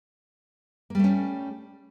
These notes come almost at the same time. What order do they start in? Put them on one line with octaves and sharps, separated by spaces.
A#3 G3 A3 C#4